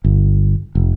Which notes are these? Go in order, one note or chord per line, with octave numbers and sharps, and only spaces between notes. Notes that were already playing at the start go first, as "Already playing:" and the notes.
G1
F1